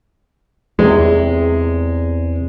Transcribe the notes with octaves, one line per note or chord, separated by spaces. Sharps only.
E2 C3 G#3